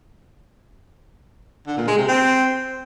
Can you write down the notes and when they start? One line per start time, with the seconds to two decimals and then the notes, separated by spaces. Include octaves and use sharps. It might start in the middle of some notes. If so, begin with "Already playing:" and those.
1.67 D3
1.77 A#2
1.88 G#3
1.98 C3
2.08 C4